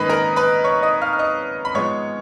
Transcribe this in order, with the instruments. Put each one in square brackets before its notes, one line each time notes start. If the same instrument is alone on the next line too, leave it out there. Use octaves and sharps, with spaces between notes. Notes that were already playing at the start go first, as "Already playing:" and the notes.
Already playing: [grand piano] G#2 D#3 A#3 C#4 B4 D#5 B5 D#6
A#4 A#5
B4 B5
C#5 C#6
D#5 D#6
F5 F6
F6
D#5 D#6
B5
G#2 F3 G#3 B3 C#5 C#6